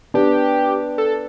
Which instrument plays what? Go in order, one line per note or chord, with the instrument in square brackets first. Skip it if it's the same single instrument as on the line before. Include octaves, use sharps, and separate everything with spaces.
[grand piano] B3 D4 [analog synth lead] G4
[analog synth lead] A4